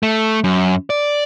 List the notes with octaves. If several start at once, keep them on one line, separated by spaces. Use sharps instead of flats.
A3
F#2
D5